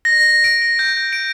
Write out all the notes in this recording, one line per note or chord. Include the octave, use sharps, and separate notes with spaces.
A#6
A#6
D7
A#6
G6
D7